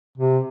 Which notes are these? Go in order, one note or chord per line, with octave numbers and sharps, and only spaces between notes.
C3